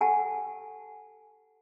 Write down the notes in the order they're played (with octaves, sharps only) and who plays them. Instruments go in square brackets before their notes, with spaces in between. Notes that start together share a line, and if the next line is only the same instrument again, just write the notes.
[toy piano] G4 A4 F#5 G#5 A5